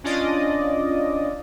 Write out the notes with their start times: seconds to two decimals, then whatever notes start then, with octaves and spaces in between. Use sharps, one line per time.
0.04 C#4 D4 F4 D5 D#5